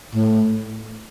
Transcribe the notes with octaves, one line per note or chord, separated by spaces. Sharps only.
A2